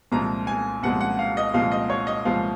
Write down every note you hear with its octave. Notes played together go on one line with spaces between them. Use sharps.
C2 A#2 F3 G#3 A#5
G#5
C2 A#2 F3 G#3 F#5
F#5
F5
D#5
C2 A#2 F3 G#3 F5
D#5
C#5
D#5
C2 A#2 F3 G#3 F5